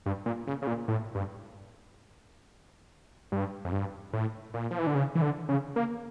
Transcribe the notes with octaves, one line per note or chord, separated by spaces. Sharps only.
G2
A#2
C#3
C#3
A#2
A2
G2
G2
F2
G2
A2
A#2
F3
E3
D3
C#3
E3
D3
C#3
A#3